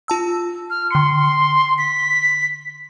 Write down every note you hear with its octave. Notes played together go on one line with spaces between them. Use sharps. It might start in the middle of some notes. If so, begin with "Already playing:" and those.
F4 A5 E6
F6
D3 C6 C#7
B6